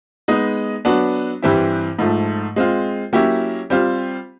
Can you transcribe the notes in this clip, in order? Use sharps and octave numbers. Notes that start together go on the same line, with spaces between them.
G#3 B3 D#4
F#3 B3 D4 F#4
G2 E3 G3 C4 E4
G#2 F3 A3
G#3 C4 F4
F#3 A#3 C#4 E4 G4
G3 C4 F4